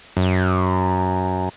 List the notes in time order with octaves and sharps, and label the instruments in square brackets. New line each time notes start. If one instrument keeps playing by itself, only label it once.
[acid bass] F#2